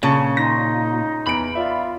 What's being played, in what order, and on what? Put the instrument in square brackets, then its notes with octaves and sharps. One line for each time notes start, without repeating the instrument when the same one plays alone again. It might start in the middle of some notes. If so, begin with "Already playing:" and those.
[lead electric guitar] A#2 [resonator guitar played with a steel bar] C#3 [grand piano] C#4 A5 C#6
[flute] D#4 [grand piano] C6 A#6
[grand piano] E2 D7 [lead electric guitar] B5
[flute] F4 [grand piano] D5 E5